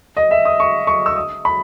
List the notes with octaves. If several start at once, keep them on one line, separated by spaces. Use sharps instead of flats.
D#5
E5
D#6
C#6
C#6
E6
D#6
B5